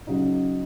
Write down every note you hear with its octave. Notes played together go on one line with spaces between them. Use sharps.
C#3 F#3 D#4 D#5